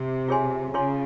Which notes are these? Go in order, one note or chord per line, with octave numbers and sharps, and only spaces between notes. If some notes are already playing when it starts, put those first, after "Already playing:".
Already playing: C3
F4 G#4 C#5 G#5 C6
C#3 F4 G#4 C#5 G#5 C6